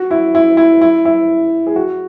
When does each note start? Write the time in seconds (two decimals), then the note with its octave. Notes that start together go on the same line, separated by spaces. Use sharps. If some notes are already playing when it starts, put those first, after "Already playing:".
Already playing: F#4
0.11 E4
0.35 E4
0.57 E4
0.81 E4
1.05 E4
1.67 G#4
1.76 F#4